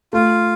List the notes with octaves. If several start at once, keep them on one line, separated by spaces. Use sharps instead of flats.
A3 F4